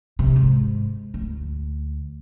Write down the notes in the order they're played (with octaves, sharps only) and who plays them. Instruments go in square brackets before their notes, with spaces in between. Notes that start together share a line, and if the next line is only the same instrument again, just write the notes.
[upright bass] C3
G#2
D2